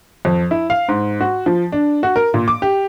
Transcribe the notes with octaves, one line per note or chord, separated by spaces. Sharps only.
F2
E4
F5
G#2
F#4
F3
D4
F#4
A#4
A#2
D6
G4